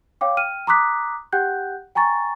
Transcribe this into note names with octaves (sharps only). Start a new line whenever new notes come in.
C#5 F5 G5 D6
G5 F6 D#7
A#5 C6 D6 D#6 F#6 B6
G4 F#5 G5 F#6 G6
G5 G#5 A#5 C#6 A6